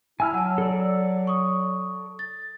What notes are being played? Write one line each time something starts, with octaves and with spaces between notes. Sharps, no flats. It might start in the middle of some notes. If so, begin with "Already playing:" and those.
E4 G#5 E6 F6
F#3 F#5 A5
A4 D5
C#6 D#6
A6